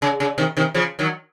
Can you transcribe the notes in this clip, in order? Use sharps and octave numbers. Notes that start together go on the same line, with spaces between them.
C#3
C#3
C3 D#3
C3 D#3
C#3 F3
D#3 F#3